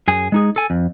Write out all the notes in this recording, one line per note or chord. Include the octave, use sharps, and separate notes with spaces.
F#2 G#4 G#5
G#3 D#4 G#4
A4 G#5
F2